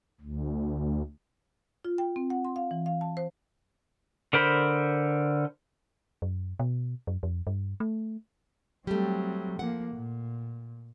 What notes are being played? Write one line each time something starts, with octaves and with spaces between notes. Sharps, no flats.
D2
F4
G5
C4
F#5
C6
F5
E3
F5
A5
C5
D3 A#4 C5 B5
F#2
B2
F#2
F2
G2
A3
F#3 G3 A3 C4
F3 A#3 F#5
A#2